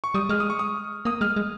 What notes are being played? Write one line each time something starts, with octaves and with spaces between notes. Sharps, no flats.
C#6
G3 D#6
G#3 F6
D#6
C#6
D#6
A#3 D#6
G#3 F6
G#3